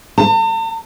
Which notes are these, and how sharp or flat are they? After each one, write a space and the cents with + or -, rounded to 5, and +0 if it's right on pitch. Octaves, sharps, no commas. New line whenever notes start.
A5 +45